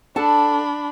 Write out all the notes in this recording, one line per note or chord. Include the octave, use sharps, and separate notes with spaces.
D4 A4 F#5 A5 B5